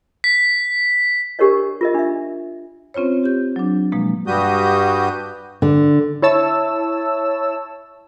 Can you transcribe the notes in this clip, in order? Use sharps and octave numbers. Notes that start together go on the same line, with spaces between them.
B6
D4 G4 A#4 C5 C#5 D#5
F4 A#4 D#5
D4 E5
C4 C#4 F4 C5 C#5
G4 G6
F#3 D4
B2 F3 G#3 A#3
G2 G3 F#4 G4 D#6 G6
D3
E4 C#5 A5 E6